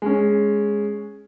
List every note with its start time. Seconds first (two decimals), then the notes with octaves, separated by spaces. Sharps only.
0.02 G#3 C#4